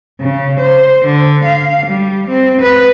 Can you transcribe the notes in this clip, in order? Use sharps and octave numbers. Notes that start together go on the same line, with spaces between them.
C#3
C5
D3
F5
G3
C4
B4